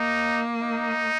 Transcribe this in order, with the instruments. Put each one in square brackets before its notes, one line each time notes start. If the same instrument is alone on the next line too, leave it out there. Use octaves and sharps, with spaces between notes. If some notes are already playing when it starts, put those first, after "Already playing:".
Already playing: [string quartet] A#3 [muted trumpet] D#4
[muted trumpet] D#4